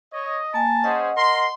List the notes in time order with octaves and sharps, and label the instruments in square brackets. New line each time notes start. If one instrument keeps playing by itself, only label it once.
[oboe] C#5 [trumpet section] D#5
[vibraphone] A#3 G#5 [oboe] A5
[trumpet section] C#4 G#4 C5 [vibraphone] D#5 F#5
[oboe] A#4 [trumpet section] C6